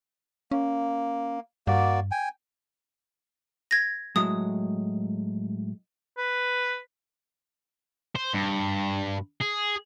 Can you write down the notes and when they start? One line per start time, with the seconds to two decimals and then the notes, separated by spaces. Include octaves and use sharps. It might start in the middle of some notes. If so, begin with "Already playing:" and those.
0.51 A#3 C#4
1.67 G2 A#3 F#4 D5
2.11 G5 G#5
3.71 G#6 A#6
4.16 A2 F#3 G#3 D#6
6.18 B4
8.16 C5
8.34 G2
9.41 G#4